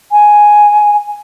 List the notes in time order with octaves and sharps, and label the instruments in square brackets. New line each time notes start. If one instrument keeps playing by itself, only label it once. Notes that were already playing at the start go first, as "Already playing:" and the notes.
[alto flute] G#5